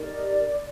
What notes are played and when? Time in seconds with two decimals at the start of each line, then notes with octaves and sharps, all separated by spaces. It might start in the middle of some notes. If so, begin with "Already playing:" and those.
Already playing: D#4 G4 A#4 D5